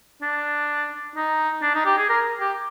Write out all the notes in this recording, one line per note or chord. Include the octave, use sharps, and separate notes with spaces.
D4
D#4
D4
D#4
G4
G#4
A#4
G4